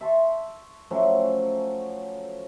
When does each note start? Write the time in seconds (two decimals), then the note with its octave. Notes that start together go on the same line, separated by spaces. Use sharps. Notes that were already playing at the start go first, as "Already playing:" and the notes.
0.01 E5 A5 C6 C#6
0.91 F3 F#3 A3 C#4